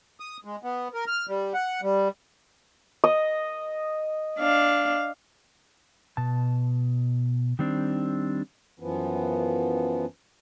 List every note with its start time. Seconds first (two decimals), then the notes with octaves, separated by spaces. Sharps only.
0.20 D#6
0.45 G#3
0.63 B3
0.94 A#4
1.07 F6
1.28 G3
1.54 F#5
1.82 G3
3.04 D#5
4.39 D4 F5
6.17 B2 A5
7.59 D#3 G3 C4 D4
8.80 F#2 E3 F3 B3